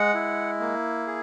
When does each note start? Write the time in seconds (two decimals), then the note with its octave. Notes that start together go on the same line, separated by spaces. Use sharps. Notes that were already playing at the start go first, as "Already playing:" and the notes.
Already playing: G#3 F#5
0.14 E4
0.60 A#3
1.07 G#4